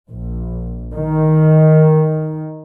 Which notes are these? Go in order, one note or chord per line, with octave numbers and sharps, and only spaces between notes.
A#1
D#3